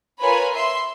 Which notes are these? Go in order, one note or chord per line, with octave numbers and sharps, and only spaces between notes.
F4 A#4 B4 C#5 G#5 B5
E5 C6